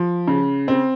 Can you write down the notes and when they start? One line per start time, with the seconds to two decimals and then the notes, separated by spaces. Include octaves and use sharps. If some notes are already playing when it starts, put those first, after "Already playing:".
Already playing: F3
0.28 C#3
0.68 C4